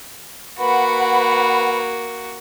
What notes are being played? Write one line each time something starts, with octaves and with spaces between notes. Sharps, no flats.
A#3 F#4 B4 F#5 B5